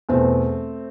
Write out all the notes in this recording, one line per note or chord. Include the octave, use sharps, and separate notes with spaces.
E2 B2 A3 C4